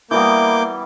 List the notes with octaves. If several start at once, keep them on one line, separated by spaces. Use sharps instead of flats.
E3 G3 A#3 B3 D6 G6